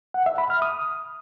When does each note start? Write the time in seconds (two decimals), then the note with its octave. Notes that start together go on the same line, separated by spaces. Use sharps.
0.14 F#5
0.26 E5
0.38 B5
0.50 F6
0.62 D#6